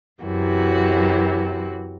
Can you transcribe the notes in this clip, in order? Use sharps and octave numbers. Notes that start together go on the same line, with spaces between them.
F#2 C3 E3 F#4